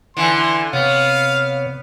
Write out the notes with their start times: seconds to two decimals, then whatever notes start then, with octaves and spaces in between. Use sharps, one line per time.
0.17 D3 E3 C6
0.73 C3 B3 C#5 F5